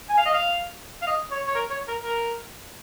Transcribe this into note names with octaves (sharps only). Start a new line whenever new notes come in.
G#5
F5
D#5
F5
F5
D#5
C#5
C#5
A#4
C#5
A#4
A#4